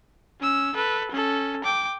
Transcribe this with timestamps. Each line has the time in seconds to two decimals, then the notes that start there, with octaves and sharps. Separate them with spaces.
0.40 C#4 E6
0.75 A4 B4
1.11 C#4 A4
1.64 G5 D6